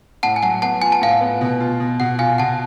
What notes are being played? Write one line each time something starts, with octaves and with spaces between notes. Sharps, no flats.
A2 F#5 A5
G#5
F#3 F#5 A5
B3 F#5 A5
F4 G#5
A5
A2 F5 G#5
B3
B2
F4
B2
B2 F#5
F4 F5 G#5
B2 F#5 A5